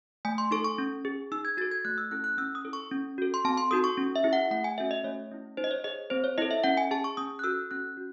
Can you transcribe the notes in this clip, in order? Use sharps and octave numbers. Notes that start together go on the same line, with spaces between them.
A3 G#5
C6
D#4 A4 C#6
C#6
C#4
G#4
D#4 E6
G#6
F#4 A4 A6
G#6
A3 F#6
E6
C#4 E4 A4 F#6
F#6
C#4 E6
D#6
E4 A4
C#6
C#4
F#4 A4
C6
C4 A5
C6
D#4 F#4 A4 D#6
C#6
C#4
E5
E4 G#4
F#5
A3 F#5
G#5
C#4 F#4 A4 E5
D#5
A3 C#5
C#4 E4
D#4 C5
D#5
C#5
G#4 D#5
C4 C5
C#5
E4 A4 D#5
E5
C#4 F#5
G#5
G#4 A5
C#6
C#4 D#6
F#6
F#4 A4 E6
C#4 F#6
F#4